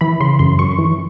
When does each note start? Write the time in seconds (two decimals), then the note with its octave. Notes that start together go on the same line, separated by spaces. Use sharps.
0.01 E3 B5
0.20 C#3 C6
0.39 F#2 C6
0.59 F#2 C#6
0.79 E3